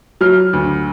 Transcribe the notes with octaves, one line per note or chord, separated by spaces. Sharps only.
F#3 F6
D2